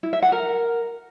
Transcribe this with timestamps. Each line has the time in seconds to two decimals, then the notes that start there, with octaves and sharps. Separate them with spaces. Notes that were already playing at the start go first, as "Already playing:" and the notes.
0.03 E4
0.13 E5
0.22 F#5
0.32 A#4